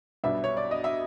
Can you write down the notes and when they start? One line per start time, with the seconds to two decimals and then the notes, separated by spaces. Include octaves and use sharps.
0.24 B1 B2 G3 B3 D4 E5
0.44 C#5
0.57 D5
0.71 D#5
0.84 E5